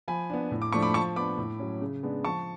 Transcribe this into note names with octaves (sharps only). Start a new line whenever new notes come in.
F3 G#5 B5
B3 D4
A2
D6
F3 A3 D4 C#6
B5 D6
F3 A5 C#6
B3 D4 B5 D6
A2
F#3 C#4
C#3
G#3 B3 D4
F3 A5 C#6